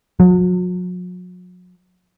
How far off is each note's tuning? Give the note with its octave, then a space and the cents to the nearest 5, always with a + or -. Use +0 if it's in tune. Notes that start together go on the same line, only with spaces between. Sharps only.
F#3 -40